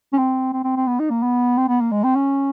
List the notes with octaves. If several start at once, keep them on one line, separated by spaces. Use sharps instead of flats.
C#4
C4
C4
C4
C4
B3
D#4
A#3
B3
C4
B3
A#3
G#3
C4
C#4